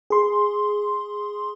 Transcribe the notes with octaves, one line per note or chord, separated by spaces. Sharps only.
G#4 C6